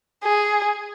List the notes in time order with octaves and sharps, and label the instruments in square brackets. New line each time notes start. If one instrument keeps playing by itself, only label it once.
[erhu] G#4